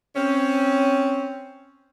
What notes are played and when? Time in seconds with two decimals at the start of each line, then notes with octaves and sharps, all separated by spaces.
0.16 C4 C#4